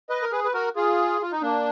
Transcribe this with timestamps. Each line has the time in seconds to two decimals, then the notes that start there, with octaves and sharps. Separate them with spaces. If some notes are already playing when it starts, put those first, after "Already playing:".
0.09 B4 D#5
0.22 A#4
0.32 G#4 B4
0.44 B4
0.54 F#4 A#4
0.76 F4 G#4
1.22 F4
1.32 D#4
1.42 A#3 D4